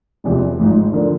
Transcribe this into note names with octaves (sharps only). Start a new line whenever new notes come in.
E1 E2 C3 F3
G#1 G#2 F3
D3 F3 A#3 D4